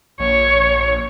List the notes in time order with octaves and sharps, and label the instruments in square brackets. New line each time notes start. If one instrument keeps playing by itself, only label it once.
[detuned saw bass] A#1 [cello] C#5